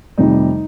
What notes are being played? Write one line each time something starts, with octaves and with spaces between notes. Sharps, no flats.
F1 F2 C3 D#3 G3 D#4